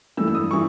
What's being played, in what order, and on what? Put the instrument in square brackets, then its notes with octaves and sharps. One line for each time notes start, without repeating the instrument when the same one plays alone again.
[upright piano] G2 E3 A3 E6
E6
D#6
E3 C#6